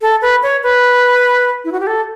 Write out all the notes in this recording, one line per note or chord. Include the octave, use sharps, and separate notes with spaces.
A4
B4
C#5
B4
E4
F#4
G4
A4